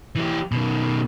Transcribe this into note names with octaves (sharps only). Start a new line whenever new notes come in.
E3 G4
B2 D#3